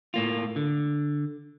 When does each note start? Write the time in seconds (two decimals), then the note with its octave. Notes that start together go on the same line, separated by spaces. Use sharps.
0.14 A2 A#3 F4
0.56 D3